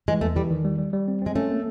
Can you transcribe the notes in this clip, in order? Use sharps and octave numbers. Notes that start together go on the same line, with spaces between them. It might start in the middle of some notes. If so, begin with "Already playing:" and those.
E3 G#3
E2 A3
E3 G3
D#3
G3
G3
G3
C4
G#3 C4
A3 C#4
A#3